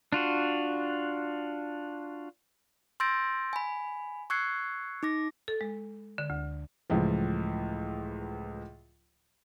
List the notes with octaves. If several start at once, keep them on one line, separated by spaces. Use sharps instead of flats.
D4 F4 F#4
C6 E6 G6 A6 A#6 D7
G#5 B5
C#6 E6 F#6 G#6 C7 C#7
D#4 D6 A#6
A4
G#3
D3
D2
C#2 A2 E3 F3